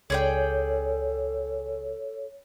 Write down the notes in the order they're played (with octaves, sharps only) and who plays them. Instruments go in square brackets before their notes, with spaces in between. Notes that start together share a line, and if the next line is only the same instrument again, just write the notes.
[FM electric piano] C#2 [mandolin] G#4 D5 G5 [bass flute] A4 [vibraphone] C#5